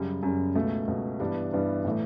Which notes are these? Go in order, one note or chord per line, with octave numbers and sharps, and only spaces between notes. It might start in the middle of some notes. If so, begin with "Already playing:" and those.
Already playing: F#2 C#3 G3
F#2 C#3 G3
C#2 B2 A3
C#2 B2 A3
G2 E3 G3 B3 D4
G2 E3 G3 B3 D4
A2 E3 A3